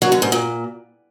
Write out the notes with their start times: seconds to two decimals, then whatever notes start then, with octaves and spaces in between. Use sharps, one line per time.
0.02 F#3
0.12 D3
0.22 G#2
0.32 A#2